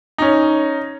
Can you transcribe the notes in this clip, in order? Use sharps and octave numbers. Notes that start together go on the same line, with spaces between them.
C#4 D#4